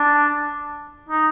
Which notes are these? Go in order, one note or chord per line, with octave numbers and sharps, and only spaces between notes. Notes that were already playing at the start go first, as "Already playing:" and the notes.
Already playing: D4
D#4